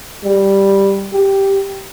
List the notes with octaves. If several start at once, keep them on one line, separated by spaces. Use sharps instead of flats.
G3
G4